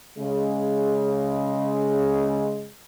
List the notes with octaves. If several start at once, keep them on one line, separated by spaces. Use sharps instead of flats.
C#3 G#3